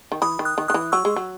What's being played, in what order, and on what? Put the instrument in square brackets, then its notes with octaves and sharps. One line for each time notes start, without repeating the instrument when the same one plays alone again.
[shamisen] D#3
[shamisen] E3 [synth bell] B5 D#6
[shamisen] D#3
[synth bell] D#6 F#6
[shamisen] D#3
[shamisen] D#3 [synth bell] D#6 F#6
[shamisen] E3
[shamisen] F#3 [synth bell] C#6 E6
[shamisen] G#3
F#3